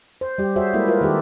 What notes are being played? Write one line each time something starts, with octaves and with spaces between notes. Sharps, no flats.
C5
G3 G4
F#4 G#4 C5 C#5 E5
G#3 A#3 E4 A4 D5 E5
F4 A#4 B4 E5
D#3 D#4 G4 A4